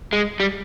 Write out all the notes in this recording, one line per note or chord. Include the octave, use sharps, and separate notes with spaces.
G#3
G3